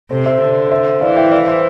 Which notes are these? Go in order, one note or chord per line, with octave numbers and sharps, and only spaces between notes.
C3 A4 C5
C5 E5
D3
C5 E5
E3 D5 F5
E5 G5
D5 F5
C5 E5